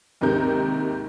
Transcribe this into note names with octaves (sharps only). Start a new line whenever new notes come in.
D#2 G#2 C3 D#4 A#4 G6